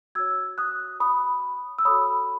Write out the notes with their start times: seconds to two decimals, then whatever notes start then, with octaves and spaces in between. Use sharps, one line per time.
0.15 F#4 C#5 E6 G#6
0.58 D#6 F#6
1.00 B5 D#6
1.79 E6
1.85 F#4 A4 C#5 B5 D#6